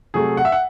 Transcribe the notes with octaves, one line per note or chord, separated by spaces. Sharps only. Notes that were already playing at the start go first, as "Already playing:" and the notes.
C3 F#3 A3 G#4
F#5
E5
F#5